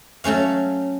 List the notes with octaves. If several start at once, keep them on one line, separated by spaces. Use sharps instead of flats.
F#3 A3 C#4 F5